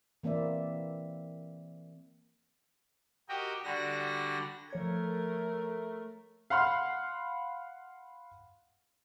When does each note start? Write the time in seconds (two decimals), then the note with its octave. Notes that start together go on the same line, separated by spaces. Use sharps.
0.23 E3 A#3 C4 D5 E5
3.29 F#4 G4 A#4 D#5 G5
3.64 D3 G3 F#4 A#6
4.70 F3 A3 A#4 C#5 G#6
6.50 F5 F#5 B5 C6 F6